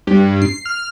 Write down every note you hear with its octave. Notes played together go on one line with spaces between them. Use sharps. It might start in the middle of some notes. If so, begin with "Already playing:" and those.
G2
C7
F6